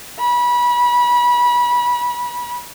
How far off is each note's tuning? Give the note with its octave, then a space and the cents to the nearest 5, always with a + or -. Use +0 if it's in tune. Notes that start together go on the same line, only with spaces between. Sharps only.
B5 -30